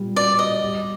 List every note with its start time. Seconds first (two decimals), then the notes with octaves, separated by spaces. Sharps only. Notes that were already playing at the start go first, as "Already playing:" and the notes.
Already playing: A#2 G3
0.16 F#4 D5
0.39 D#5
0.61 G3